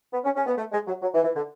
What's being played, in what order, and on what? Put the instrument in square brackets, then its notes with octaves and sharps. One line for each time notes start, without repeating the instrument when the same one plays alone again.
[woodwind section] B3
C#4
C#4
B3
A3
G#3
F#3
F#3
E3
E3
D3